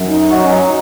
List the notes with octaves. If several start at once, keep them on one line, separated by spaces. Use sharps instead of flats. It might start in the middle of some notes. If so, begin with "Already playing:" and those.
Already playing: F#2
D#4
F#3 F#4
C#4
D#4